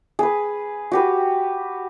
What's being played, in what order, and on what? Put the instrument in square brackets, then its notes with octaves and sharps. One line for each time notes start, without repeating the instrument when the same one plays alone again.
[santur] G#4 B4
F#4 G4 B4